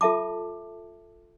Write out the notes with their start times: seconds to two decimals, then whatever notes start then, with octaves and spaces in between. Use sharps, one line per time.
0.01 F4 A4 E5 A5 D6